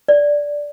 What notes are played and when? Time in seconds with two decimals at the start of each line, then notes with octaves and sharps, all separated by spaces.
0.08 D5